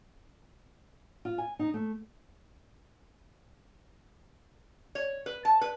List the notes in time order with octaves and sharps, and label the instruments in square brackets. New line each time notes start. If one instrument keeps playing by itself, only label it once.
[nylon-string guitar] F4
G#5
D#4
A3
[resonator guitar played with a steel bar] C#5
B4
A5
B4